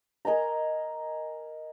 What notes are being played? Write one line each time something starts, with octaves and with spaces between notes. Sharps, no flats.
A#4 D#5 G#5 A#5